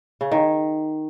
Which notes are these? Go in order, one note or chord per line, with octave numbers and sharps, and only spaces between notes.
C#3
D#3